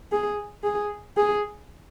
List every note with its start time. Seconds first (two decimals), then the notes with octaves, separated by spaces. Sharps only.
0.12 G#4
0.64 G#4
1.17 G#4